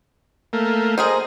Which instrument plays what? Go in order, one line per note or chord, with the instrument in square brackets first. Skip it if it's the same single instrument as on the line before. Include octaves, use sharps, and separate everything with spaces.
[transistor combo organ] A3 A#3
[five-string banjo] G#4 A#4 C5 [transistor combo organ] D#5